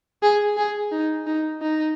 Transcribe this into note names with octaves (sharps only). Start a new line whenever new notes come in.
G#4
G#4
D#4
D#4
D#4